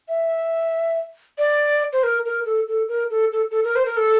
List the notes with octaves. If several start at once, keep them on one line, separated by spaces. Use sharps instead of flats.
E5
D5
C5
A#4
A#4
A4
A4
A#4
A4
A4
A4
A#4
C5
A#4
A4